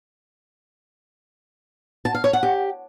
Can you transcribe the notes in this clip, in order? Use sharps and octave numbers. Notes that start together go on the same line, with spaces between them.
A5
F5
C#5
F#5
G4